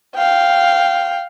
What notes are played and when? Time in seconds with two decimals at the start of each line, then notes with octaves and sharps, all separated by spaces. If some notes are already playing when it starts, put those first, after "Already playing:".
0.16 F5 G5